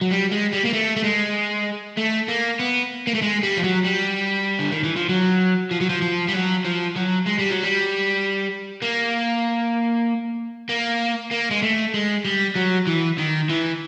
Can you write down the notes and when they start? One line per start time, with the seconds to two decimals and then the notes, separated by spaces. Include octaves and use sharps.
0.01 F#3
0.11 G3
0.31 G#3
0.52 G3
0.64 A#3
0.73 A3
0.96 A3
1.04 G#3
1.98 A3
2.28 A#3
2.59 B3
3.07 A#3
3.15 A3
3.22 G#3
3.43 G3
3.57 F3
3.64 F#3
3.84 G3
4.59 D3
4.72 D#3
4.84 E3
4.96 F3
5.09 F#3
5.71 F3
5.81 F#3
5.90 F3
6.02 F3
6.28 G3
6.33 F#3
6.64 F3
6.96 F#3
7.26 G#3
7.39 G3
7.51 F#3
7.64 G3
8.82 A#3
10.69 A#3
11.31 A#3
11.51 G#3
11.62 A3
11.94 G#3
12.25 G3
12.55 F#3
12.87 E3
13.18 D#3
13.50 E3